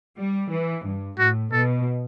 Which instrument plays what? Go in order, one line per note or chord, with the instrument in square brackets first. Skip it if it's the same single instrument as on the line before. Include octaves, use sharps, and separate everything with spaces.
[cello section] G3
E3
G2
[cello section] A2 [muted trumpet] F#4
[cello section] B2 [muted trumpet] A4